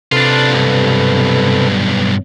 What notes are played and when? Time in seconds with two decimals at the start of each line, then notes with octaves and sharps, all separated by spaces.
0.12 C3 D4 F4 A4 B4
0.53 B1 G2